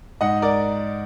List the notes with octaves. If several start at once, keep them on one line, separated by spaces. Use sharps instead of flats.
G#2 D#5 F#5
A#4 D5